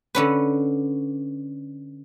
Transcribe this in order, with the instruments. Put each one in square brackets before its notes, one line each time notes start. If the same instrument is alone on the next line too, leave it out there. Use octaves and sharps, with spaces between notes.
[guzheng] D3 C#4 B4